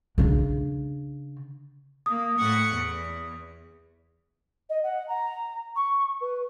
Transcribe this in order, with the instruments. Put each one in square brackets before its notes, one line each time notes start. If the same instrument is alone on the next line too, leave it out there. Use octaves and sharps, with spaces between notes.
[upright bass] C#3 D4
[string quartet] A#3 [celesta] D#6
[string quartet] A2 F#5 C#6
E2
[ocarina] D#5
F#5
A#5
C#6
B4